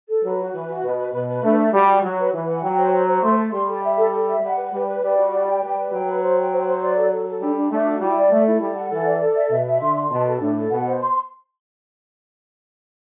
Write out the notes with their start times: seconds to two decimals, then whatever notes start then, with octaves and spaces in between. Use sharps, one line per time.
0.09 A4
0.23 F#3 B4
0.39 F#4
0.53 E3 B4
0.69 F#4
0.82 B2 B4
0.99 B4
1.13 B2 B4
1.27 B4
1.43 A3 D4
1.58 A4
1.72 G3 F#4
1.88 F#4
2.02 F#3 F#4
2.18 B4
2.33 E3 B4
2.48 F#5
2.62 F#3 G5
2.77 C5
2.92 C5
3.07 C5
3.22 A3 C6
3.37 A4
3.52 G3 C6
3.67 A4
3.83 E5
3.97 A4
4.11 A4
4.27 E5
4.42 G3 F#5
4.57 B4
4.72 G3 B4
4.87 B4
5.02 G3 D5
5.17 F#4
5.31 D5
5.47 G5
5.62 G3 B4
5.77 B4
5.91 F#3 G5
6.07 B4
6.22 C5
6.37 G5
6.52 C5
6.67 C5
6.82 D5
6.96 A4
7.11 A4
7.27 A4
7.40 G3 D4
7.55 D4
7.71 A3 D4
7.86 F#4
8.01 G3 E4
8.16 D5
8.31 A3 A4
8.46 E4
8.61 G3 A4
8.75 F#5
8.90 E3 A4
9.06 D5
9.21 A4
9.35 E5
9.50 B2 E5
9.66 E5
9.80 D3 C6
9.96 C6
10.10 B2 A5
10.26 A4
10.40 A2 D4
10.55 A4
10.70 B2 F#5
10.86 C5
11.00 C6